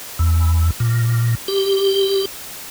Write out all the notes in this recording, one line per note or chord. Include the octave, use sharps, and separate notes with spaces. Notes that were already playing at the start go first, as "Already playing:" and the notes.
E2
A#2
G4